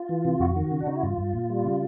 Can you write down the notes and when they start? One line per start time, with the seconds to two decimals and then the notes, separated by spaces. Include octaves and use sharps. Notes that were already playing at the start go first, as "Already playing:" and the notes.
Already playing: F4
0.09 E3
0.25 C3
0.40 F2 F#4
0.56 D#3
0.72 C#3
0.80 D4
0.86 C#3 D#4
0.96 E4
1.03 G2 F4
1.18 G2
1.34 A#2
1.50 G3
1.64 C#3